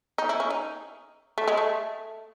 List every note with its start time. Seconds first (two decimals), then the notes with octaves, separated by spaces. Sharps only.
0.18 D#4
0.29 E4
0.40 C#4
0.50 D#4
1.38 A3
1.48 G#3
1.57 A3